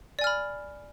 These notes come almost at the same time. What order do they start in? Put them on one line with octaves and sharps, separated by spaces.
D5 G#5 F6 B5